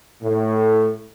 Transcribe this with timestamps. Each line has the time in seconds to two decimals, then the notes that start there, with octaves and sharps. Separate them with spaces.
0.23 A2